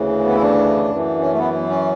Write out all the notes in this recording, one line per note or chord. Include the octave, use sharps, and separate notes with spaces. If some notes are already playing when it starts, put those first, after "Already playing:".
Already playing: D2 C#3 E3
B3
E4
D4
F#2 E3
C#4
A3
B3
C#4